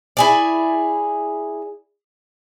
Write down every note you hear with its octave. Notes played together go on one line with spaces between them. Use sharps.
E4 G#4 D5